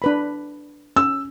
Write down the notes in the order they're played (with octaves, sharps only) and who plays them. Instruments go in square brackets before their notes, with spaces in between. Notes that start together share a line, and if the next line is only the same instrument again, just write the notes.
[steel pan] D4 B4 B5
[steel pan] C#4 [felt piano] E6